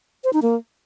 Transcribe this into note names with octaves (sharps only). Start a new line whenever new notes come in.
C5
D#4
A#3